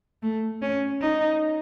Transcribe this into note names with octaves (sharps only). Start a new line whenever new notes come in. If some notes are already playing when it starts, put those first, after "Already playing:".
A3
C#4
D#4